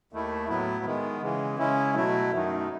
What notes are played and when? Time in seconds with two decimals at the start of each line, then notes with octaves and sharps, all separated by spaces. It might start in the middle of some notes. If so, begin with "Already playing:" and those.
0.13 D#2 D#3 A3 E4
0.49 A2 F#3 B3 E4
0.85 D#3 G#3 B3
1.22 C#3 E3 G#3
1.58 C#3 G#3 C#4 E4
1.95 B2 F#3 A3 E4
2.33 F#2 D#3 F#3 A3 D#4